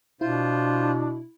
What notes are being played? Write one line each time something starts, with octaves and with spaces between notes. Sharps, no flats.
B2 D4 E4 F4 C5